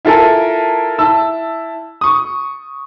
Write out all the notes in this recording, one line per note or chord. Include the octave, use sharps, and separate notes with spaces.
E4 F4 A4 A#4 G#5
E4 A5 E6
C#6 D#6